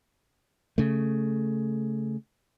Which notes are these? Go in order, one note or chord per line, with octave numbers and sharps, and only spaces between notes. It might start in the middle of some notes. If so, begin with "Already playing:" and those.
C#3 A3